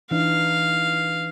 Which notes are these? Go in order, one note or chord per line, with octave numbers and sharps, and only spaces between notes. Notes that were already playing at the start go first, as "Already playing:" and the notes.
E3 D4 D#4 F5